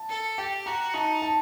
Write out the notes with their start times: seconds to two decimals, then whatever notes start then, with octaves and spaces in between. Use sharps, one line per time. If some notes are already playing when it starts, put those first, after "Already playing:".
Already playing: A5
0.09 A4
0.38 G4 G5
0.66 F#4 A#5
0.94 D#4 A5
1.22 A5